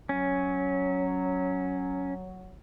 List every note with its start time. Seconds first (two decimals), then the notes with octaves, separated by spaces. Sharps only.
0.09 F#3 C#4